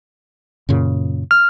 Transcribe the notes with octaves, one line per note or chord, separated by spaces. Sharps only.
F#2 A#2 C#3
F6